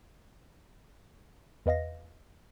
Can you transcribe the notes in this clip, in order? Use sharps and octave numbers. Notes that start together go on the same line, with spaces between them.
E2 B4 D#5 F5 A#6